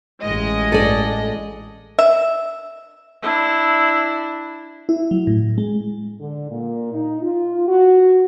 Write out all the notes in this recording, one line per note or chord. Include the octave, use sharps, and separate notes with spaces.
A1 G#3 D#5
A4 D5
E5
D4 E4
E4
F#3
A2
G#3
D3
A#2
D#4
F4
F#4